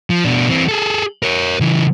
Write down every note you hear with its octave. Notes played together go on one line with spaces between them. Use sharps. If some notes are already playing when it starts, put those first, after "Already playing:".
F3
B2 D4
E3 C4
G#4 A4
A#4 C#5
C#3 E3